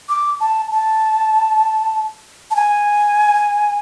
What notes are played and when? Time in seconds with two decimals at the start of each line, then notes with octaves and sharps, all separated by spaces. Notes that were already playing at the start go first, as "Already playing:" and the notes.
0.09 D6
0.40 A5
0.71 A5
2.51 A5
2.56 G#5